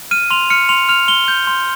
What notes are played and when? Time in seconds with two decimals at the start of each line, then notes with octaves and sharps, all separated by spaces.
0.11 F6 D#7
0.30 C6 F7
0.50 F6 C#7
0.69 C6 F7
0.89 F6 F7
1.08 C6 G7
1.28 G6
1.47 C6